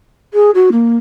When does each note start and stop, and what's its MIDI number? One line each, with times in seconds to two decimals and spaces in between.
0.34 0.50 68
0.54 0.69 66
0.72 0.97 58